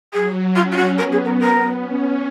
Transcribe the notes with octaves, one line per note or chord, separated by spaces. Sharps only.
F#3 G#4
C#4 F4
F4
F#4
B3 A#4
G#4
A#4
A#4
C#4